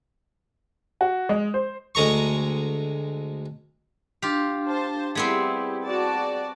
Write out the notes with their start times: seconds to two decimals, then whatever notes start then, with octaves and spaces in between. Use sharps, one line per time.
1.01 F#4
1.29 G#3
1.54 C5
1.95 D2 G#3 A#5 C#6
4.22 D4 F4 G4
4.67 C5 A5
5.15 G3 B3 C4 E4 G4 G#4
5.85 F#4 D5 A5